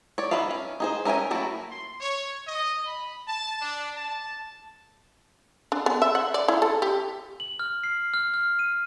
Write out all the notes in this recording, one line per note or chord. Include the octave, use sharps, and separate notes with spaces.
C#5 D5
D#3 F#4 B4 E5 F5
C#4
D#4 G#4 C5
C#4 A#4 E5 G5 G#5
F#3 A3 A#3 E4 F#4
C6
C#5
D#5
B5
A5
D4
A5
D4
B3
E5
F#5
D5
E4
A4
G4
F#7
F6
C7
F6
F6
D#7